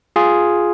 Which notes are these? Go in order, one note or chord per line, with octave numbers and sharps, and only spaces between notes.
F4 G#4